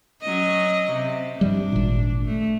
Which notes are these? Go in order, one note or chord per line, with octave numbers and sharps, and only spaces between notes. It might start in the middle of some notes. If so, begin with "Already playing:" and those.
F#3 C#4 D#5
C3
G2 F3 G3 D4
G#1 A#2
A3